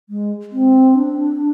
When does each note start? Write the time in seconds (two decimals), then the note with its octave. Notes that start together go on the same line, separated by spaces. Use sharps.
0.09 G#3
0.52 C4
0.95 D4